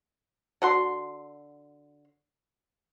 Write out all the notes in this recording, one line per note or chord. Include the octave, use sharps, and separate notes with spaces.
D3 F#4 C6